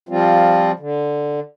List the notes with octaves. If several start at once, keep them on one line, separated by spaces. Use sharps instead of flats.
F3 G3 C4 F4
D3